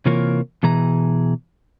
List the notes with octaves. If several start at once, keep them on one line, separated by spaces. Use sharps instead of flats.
C3 E3 A#3 F4 A#4 C#5
B2 E3 G#4 A#5